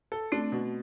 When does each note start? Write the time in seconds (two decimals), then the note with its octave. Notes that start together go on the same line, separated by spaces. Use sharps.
0.12 A4
0.32 A3 C4 D4
0.52 B2